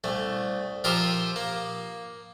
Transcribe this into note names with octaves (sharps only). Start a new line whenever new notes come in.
C2 A3
F3 F4 G4 A#4 C5 E5
A#3